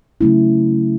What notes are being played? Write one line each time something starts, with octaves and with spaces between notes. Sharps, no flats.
C#3 F#3 A3 C#4 E4